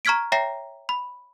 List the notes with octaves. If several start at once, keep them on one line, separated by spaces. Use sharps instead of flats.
A#5 C#6 F6 G#6 B6 D7
C#5 E5 G5 A#5 A#6 C7
B5